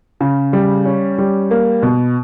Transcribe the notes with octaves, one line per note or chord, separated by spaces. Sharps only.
C#3
G3
C#4
G3
A#3
B2